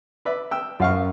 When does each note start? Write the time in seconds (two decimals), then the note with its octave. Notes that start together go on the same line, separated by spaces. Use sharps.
0.25 B4 D5 E5
0.51 G5 E6
0.80 F#2 F4 F5 C#6